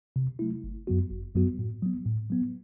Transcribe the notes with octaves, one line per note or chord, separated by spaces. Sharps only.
C3
F#3 A3 E4
G1
F#2 F#3 B3 F#4
G1
F#2 F#3 B3 F#4
A2
F#3 B3
A2
F#3 B3